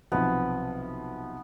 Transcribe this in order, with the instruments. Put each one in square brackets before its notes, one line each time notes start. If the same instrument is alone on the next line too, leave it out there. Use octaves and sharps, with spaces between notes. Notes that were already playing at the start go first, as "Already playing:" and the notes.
[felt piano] B1 C3 F3 [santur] B3